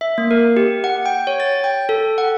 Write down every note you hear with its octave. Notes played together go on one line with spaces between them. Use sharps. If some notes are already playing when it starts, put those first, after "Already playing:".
E5
A#3
A#4
G4
F#5
G5
C#5
A6
G5
A4
F#5